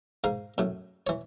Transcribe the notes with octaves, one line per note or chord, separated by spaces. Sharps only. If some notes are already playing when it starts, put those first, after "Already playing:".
G#2 A#4 F5
F#2 A2
E3 C#5